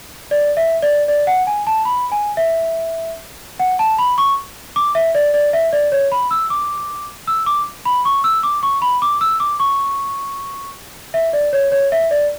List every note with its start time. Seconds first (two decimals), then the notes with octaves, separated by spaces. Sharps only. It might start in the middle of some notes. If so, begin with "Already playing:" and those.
0.31 D5
0.57 E5
0.83 D5
1.08 D5
1.27 F#5
1.47 G#5
1.67 A5
1.85 B5
2.12 G#5
2.37 E5
3.59 F#5
3.79 A5
3.98 B5
4.18 C#6
4.76 D6
4.95 E5
5.15 D5
5.34 D5
5.53 E5
5.73 D5
5.92 C#5
6.12 B5
6.31 E6
6.50 D6
7.27 E6
7.46 D6
7.85 B5
8.05 C#6
8.24 E6
8.43 D6
8.63 C#6
8.82 B5
9.02 D6
9.21 E6
9.40 D6
9.60 C#6
11.14 E5
11.33 D5
11.53 C#5
11.72 C#5
11.92 E5
12.11 D5